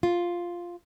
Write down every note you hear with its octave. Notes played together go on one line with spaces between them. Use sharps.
F4